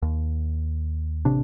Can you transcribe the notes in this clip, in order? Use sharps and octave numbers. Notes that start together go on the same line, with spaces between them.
D#2
A1 C3 D4